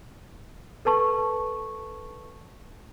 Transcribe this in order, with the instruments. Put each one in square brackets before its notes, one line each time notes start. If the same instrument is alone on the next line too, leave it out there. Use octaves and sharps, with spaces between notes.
[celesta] A4 B4 A5 C#6